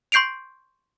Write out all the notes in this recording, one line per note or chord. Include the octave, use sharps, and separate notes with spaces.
C6 C#6 G6 C7 D7 F7